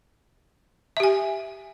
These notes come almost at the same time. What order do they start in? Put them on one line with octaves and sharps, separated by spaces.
E5 G4 G#5